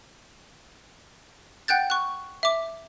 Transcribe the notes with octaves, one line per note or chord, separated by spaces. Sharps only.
F#5 G5 F#6 G6 A6
C#6 F#6
E5 D6